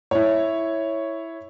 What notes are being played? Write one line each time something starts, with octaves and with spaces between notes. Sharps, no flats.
E4 C#5